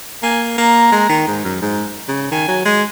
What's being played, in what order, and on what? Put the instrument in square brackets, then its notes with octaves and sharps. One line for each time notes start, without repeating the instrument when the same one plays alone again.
[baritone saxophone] A#3 [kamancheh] G#5
[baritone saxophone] A#3 [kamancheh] A#5
[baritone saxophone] G#3
D#3
G#2
F#2
G#2
C#3
[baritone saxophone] D#3 [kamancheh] G#5
[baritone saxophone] F#3
G#3